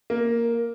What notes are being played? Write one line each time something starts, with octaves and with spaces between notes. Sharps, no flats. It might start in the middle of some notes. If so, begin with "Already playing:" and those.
A#3